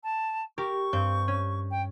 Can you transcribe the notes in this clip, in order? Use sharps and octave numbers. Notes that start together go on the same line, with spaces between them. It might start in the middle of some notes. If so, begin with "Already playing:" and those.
A5
G4 A#4 C#6
G2 C4 G6
C#4
G5